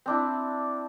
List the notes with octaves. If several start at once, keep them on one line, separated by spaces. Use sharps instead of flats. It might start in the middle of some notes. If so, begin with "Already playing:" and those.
C4 D4 E4